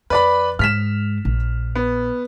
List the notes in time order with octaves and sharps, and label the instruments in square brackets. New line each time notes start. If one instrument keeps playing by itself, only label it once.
[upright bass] F2 [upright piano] B4 D5 B5
[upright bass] G#2 [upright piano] F6 B6 E7
[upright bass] A#1
[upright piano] B3